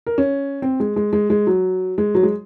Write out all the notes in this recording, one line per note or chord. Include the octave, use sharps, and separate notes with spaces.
A#4
C#4
C4
G#3
G#3
G#3
G#3
F#3
G#3
F#3
G#3